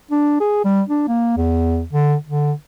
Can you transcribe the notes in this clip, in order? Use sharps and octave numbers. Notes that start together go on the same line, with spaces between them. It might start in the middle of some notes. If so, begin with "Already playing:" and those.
D4
G#4
G3
D4
A#3
E2
D3
D3